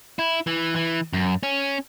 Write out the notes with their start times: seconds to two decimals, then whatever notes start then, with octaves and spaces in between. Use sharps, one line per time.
0.19 E4
0.47 E3
0.76 E3
1.13 F#2
1.43 C#4